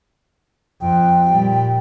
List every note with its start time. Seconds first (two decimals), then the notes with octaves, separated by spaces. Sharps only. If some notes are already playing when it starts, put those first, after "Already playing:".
0.81 F2 G5
1.27 A#2 G3